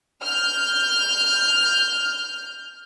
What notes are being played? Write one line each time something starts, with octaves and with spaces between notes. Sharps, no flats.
F6 G6